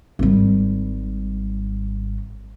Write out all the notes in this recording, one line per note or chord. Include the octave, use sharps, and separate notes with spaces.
G#1 G3